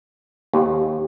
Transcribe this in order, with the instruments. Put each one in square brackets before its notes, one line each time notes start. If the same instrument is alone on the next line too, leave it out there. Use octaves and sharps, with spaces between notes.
[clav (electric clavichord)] D#2 [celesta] G4